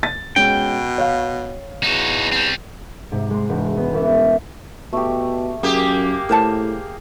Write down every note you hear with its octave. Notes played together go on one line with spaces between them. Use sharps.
A6
B2 G#3 C#4 G5
C#5 F5
E2 D#4 F#4
G3 C4
G#2 C3
G#3 C6
E1
B3
C2 E3 C#4 E5
B2 A3 G4
F#2 A#3 G4 G#4 G5
A2 A#4 C5 A5